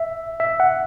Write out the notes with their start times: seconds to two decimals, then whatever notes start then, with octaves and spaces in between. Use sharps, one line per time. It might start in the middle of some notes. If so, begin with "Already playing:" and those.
Already playing: E5
0.40 E5
0.60 F#5